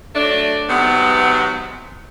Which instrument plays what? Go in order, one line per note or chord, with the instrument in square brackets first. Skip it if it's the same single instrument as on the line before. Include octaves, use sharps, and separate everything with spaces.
[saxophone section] F#3 A3 D4
G#2 C3 F#3 B3